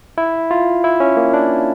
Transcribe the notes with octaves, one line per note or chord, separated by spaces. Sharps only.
E4
F4
E4
C#4
A#3
D4